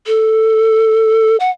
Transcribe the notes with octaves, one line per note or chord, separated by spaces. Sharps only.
A4
F#5